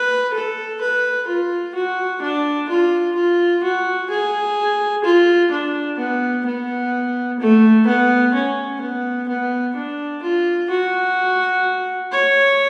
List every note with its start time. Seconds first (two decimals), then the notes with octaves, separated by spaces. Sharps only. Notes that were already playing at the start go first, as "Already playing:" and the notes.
Already playing: B4
0.34 A4
0.81 B4
1.27 F4
1.75 F#4
2.22 D4
2.69 F4
3.16 F4
3.64 F#4
4.10 G#4
5.04 F4
5.51 D4
5.99 B3
6.46 B3
7.40 A3
7.87 B3
8.34 C#4
8.81 B3
9.28 B3
9.76 D4
10.23 F4
10.70 F#4
12.12 C#5